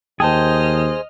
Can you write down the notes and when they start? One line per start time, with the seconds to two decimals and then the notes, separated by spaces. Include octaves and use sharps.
0.20 D#2 G#4 C5 D#5 G5 A5 F6